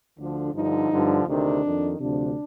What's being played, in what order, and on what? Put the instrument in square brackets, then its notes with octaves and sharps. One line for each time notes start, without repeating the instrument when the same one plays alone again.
[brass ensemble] D2 D3 F3 D4
G2 D3 F3 D#4
G2 D3 F3
D2 C3 D#3 D4
F2 D#3
D2 C3 F3 D4